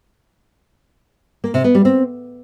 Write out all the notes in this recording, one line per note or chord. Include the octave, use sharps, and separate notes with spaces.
A#3
C3
B3
G3
C4